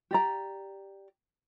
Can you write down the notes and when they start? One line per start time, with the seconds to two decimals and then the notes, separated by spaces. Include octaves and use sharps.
0.11 G4 D5 A#5